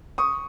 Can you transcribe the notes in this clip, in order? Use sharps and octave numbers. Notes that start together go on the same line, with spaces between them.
C#6 D#6